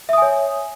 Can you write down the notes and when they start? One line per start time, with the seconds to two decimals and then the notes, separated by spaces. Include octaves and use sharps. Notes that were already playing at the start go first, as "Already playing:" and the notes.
0.09 E5
0.13 D#6
0.18 G#5
0.22 C#5